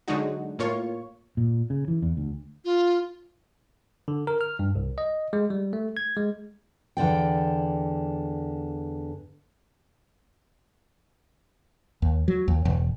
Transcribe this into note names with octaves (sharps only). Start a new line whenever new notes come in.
D3 F#3 G#3 D4 D#4 F#4
A2 A#3 F4 C#5 C#6
A#2
C#3
E3
E2
D2
F4
D3
A#4
F6
G2
C2
D#5
G#3
G3
A3
G#6
G#3
E2 D3 D5 G5
D#2
F#3
D#2
E1